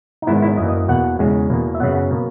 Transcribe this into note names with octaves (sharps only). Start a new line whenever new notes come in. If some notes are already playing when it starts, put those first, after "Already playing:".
D#4
G#2 D#3 G#3 B3 E4
E4
F#2 E3 A#3 D#5
D#5
E2 B2 A#3 F#5
E2 C#3 G#3
E2 B2 A#3
E5
F#2 C#3 F#3 B3 F#5
B2 A#3